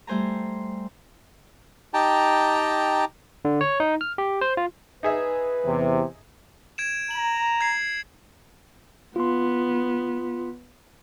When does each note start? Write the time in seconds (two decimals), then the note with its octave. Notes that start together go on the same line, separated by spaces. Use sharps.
0.07 G3 A3 C5 G#5 A#5
1.94 D#4 G4 G5 A5 A#5
3.45 D3
3.61 C#5
3.80 D#4
4.01 F6
4.18 G4
4.41 C5
4.57 F4
5.03 D#4 G#4 B4 E5
5.65 E2 C3
6.78 G#6 D7 E7
7.11 A#5 F#7
7.61 G#6 C7
9.16 B3 F4 C6